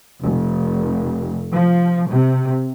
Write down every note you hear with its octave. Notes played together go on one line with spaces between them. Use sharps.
F1
F3
C3